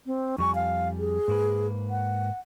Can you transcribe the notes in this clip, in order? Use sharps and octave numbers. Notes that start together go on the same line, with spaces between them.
C4
F2 G3 G#5 C#6
F5
G#4
G#2 A#3 B4
F#5